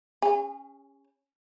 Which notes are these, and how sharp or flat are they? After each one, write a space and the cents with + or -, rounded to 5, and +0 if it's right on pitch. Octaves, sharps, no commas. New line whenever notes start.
C#4 +0 G#4 -40